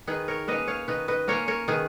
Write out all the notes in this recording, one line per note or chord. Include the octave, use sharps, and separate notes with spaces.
D#3 G#4 B4
A#4 C#5
A#3 C#4 B4 D#5
C#5 F5
D#3 B4 D#5
B4 D#5
A#3 C#4 A#4 C#5
A#4 C#5
D#3 G#4 B4